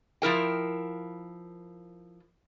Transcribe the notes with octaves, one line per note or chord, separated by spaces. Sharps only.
F3 E4 A#4 G5